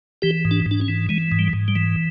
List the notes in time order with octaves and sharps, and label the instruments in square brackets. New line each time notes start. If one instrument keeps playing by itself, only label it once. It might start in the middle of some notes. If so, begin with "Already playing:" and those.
[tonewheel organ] E3 G4
G#2
D4
G#2
D4
C#4
E3
E3 G#3
G#2
G3
G#2
G3
E3